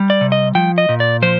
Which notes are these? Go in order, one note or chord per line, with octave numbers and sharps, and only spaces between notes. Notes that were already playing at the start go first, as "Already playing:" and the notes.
Already playing: G3
D5
C3
D#5
F3 G5
D#5
A#2
D5
F3 C5